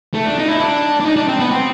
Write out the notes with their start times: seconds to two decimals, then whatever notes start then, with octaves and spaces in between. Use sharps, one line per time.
0.14 A3
0.25 D4
0.39 D#4
0.48 E4
0.60 D4
1.00 D4
1.06 D#4
1.16 D4
1.28 C4
1.39 B3
1.51 C4